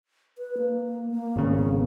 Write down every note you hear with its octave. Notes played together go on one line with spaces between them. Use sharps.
B4
A#3
A#3
G#1 C#3
B3